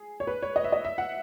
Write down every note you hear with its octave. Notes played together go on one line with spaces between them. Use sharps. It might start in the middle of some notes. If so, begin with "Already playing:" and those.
Already playing: G#4
C#5
B4
C#5
D#5
E5
D#5
E5
F#5